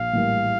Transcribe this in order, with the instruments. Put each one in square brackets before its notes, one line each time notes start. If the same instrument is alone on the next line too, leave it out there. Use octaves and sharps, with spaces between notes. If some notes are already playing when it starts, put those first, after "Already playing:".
Already playing: [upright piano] A#1 [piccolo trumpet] F5
[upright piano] A2 E3 G3 A#3